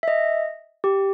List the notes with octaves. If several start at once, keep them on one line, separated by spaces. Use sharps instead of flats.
E5
D#5
G4